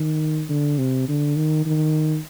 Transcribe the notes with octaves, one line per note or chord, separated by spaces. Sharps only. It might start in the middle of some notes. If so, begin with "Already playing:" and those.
Already playing: D#3
D3
C3
D3
D#3
D#3